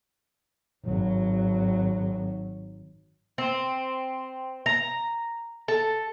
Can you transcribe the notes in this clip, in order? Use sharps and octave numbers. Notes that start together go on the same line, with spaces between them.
G#1 F#3
C4
A#5
A4